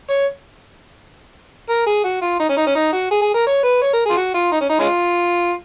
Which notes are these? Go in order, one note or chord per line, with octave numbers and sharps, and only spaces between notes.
C#5
A#4
G#4
F#4
F4
D#4
C#4
D#4
C#4
D#4
F#4
G#4
G#4
A#4
C#5
B4
C#5
A#4
G#4
F4
F#4
F4
D#4
C#4
D#4
G#3 C#4 F4